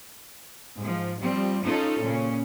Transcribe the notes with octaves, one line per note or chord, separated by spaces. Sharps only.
G#2 F3
F3 G3 C4
C#4 D#4 F4 A4
A#2 C#3 C#4